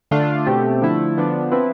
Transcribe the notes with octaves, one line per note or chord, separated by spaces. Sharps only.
D3 A3 D4 F4
B2 A3 C4 G4
D3 F3 A3 E4
D3 F3 B3 D4
F3 C4 E4 B4